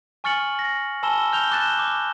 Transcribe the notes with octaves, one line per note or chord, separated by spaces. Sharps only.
G#5 C#6 F6 A6 C#7 F#7
A6 A#6
G#5 A5 B5 E6 E7 G7
F6 G6 F7 G7
A5 D6 F#6 A6 E7 G7
D6